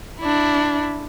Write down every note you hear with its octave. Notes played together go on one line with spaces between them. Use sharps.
D4 E4